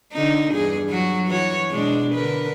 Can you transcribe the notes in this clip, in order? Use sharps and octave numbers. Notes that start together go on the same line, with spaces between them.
D3 D#4
E2 G2 G#4
F#3 F#4
E3 F#4 C#5
B2 G#3 D4
D3 A#4 B4